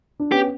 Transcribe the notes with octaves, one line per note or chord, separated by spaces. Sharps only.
D4
B3 C#4 G4